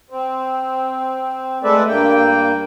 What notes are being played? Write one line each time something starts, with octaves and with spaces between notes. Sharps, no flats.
C4
G#3 A3 A4 B4 D5 E5
G2 A#3 G5